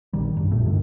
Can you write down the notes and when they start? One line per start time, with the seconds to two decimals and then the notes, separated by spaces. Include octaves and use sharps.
0.13 A#1 D#3 G3
0.37 C2 G2
0.52 A#1 F#2 A#2 A3
0.66 D2 G2 D#3